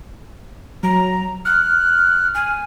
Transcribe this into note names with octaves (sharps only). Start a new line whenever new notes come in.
F#3 A#5
F6 F#6
G#5